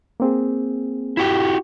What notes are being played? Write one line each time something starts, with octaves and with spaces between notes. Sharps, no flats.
A#3 C4 G#4
E4 F#4 G4